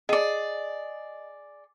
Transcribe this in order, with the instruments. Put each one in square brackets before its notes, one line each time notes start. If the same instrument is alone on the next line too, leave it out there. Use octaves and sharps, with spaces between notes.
[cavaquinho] G#4 D5 [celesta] D#5